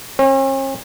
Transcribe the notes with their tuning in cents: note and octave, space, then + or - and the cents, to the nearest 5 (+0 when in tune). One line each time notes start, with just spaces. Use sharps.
C#4 -45